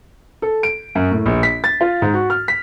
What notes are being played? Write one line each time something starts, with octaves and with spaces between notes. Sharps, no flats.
A4
D7
F#2
A2
A#1
B6
A6
F4
G#2
F#4
F6
B6